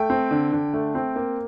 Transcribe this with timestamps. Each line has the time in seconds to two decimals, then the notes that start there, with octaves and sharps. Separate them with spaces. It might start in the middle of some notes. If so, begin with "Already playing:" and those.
Already playing: A3 G5
0.10 C4
0.31 D3
0.52 D3
0.74 A3
0.95 C4
1.16 A#3